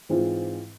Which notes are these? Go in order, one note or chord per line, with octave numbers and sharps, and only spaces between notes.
G#2 E3 G#3 C4 F4